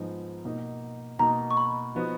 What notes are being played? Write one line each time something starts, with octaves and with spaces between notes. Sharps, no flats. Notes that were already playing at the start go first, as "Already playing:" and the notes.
Already playing: G#2 F3 G#3 B3 D#4
B2 A#3 D#4
B2 A#3 D#4 A#5
C#6
B5
F3 B3 D#4 F#4